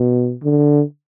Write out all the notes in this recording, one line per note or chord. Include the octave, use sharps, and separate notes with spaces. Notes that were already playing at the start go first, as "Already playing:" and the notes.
Already playing: B2
D3